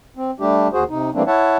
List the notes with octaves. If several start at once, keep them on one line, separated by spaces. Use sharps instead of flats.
C4
G3 A3 D4 G4
D#2 F#4 G#4 C5
C3 D#4
E3 G3 A3 A#3 C4 D4
E4 C#5 E5 F#5 A5